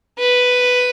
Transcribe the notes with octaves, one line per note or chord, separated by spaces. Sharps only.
B4